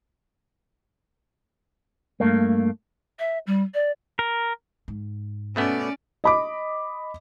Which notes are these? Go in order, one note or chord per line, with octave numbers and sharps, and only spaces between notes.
G2 A3 A#3
E5
G3
D5
A#4
G#2
B2 A3 B3 C#4 D5
D#5 B5 D6